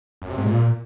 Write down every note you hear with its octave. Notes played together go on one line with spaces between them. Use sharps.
F#2
C3
G#2
A#2